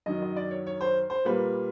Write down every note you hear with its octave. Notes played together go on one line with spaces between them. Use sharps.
F#2 D#3 F#3 D#5
D#5
D5
C#5
C#5
C5
C5
A#2 G3 A#3 B4